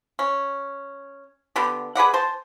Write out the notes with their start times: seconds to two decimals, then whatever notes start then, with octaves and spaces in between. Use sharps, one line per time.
0.19 C#4
1.56 D3 B3 G4
1.95 G#4 B4 D5 F#5
2.14 C5 A5